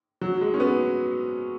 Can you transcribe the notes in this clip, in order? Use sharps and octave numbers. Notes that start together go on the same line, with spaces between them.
F#3
G#3
C#4
B3